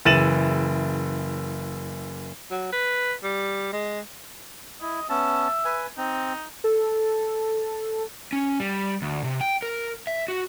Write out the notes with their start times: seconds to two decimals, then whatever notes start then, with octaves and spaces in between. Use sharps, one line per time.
0.05 F#1 E3 A6 D#7 E7 F#7
2.51 F#3
2.73 B4
3.24 G3
3.73 G#3
4.81 E4 D#5
5.09 B3 C#4 E5 A5
5.65 B4 G#5
5.98 C4 D#4
6.64 A4
8.33 C#4
8.60 G3
9.02 D2
9.24 C3
9.41 G5
9.62 A#4
10.07 E5
10.28 F#4